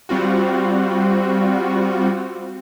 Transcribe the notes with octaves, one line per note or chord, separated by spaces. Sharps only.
G3 C4 F4 F#4